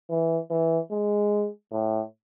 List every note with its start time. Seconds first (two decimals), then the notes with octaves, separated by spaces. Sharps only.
0.10 E3
0.51 E3
0.91 G#3
1.72 A2